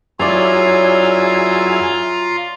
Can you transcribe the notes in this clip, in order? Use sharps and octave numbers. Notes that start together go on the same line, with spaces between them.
F#2 E4 F4 G#4 C#5 D5 F5 A#5